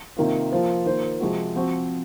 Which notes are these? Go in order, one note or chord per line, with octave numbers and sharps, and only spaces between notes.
C3 D#3 A#3 F4
F3 A#3 F4 C5
D#3 A#3 F4 C5
C3 F3 G#3 C4 F#4
F3 C4 F#4